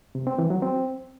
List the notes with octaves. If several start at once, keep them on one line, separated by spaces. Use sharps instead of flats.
C3
C4
E3
F#3
C4